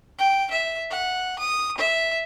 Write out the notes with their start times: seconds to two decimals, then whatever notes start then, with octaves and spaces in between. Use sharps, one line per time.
0.19 G5
0.51 E5
0.91 F#5
1.39 D#6
1.78 E5